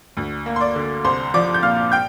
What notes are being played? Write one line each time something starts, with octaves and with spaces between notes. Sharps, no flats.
D2
A#3
C6
D5 D6
D3
C2 C5 C6
F3 D5 D6
G6
A#2 F5 F6
G5 G6